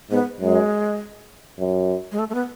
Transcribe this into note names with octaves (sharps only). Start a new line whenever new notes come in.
G#2 B3
F#2 G#3
F#2
G#3
A3
A3
B3